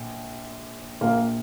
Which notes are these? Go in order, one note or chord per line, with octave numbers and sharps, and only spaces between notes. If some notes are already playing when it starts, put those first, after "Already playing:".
Already playing: A#1
A#1 A#2 A#3